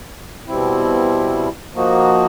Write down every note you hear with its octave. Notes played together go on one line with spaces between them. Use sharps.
B2 G3 C4 E4
F3 A#3 D#4 F#4